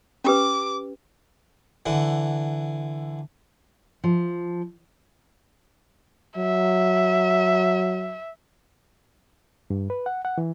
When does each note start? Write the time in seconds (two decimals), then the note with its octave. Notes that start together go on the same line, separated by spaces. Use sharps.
0.25 C#4 G4 B4 D6
1.86 D3 E3 F#5
4.04 F3
6.37 F#3 E5
9.70 G2
9.90 B4
10.06 F#5
10.25 F#5
10.38 E3